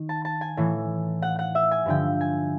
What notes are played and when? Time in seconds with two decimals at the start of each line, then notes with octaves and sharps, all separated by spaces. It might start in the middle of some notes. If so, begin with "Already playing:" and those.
Already playing: D#3
0.09 A5
0.25 A5
0.41 G#5
0.57 A2 E3
1.22 F#5
1.39 F#5
1.55 E5
1.71 G#5
1.86 G2 D3 F3 G5
2.21 G#5